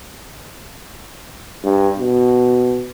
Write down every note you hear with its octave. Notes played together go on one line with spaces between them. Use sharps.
G2
B2